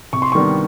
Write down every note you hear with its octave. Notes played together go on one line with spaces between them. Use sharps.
C3 C#6
C6
D#3 G3 B3 D4 C#6